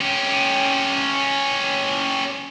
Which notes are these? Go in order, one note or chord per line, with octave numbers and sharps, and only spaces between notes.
C#4 G4